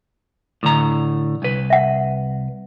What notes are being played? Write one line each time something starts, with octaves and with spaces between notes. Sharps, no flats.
A2 D3 A#5
C2 B4
E5 F#5